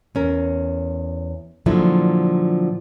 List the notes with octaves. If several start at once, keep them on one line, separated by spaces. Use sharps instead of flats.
E2 C#4 A#4
A#2 D3 F3 F#3 E4